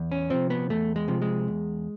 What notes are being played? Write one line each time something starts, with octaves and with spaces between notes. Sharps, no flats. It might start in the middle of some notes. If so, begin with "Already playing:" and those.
Already playing: E2
C#4
C3 F3 C4
B3
E2 A3
G#3
C3 F3
G#3
E2